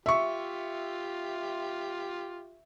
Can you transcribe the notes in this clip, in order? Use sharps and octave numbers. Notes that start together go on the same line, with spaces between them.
F4 G4 E5 C#6